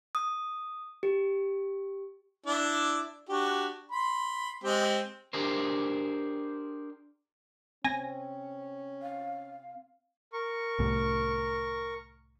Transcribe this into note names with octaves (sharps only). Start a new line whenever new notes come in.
D#6
G4
D4 E4 D5
D4 F#4 G4
B5 C6
G#3 C4 G4
D4 G4 G#4 A#4 C5
C4 C#4 G#5 A#6
F5
A#4 C#6
C2 A2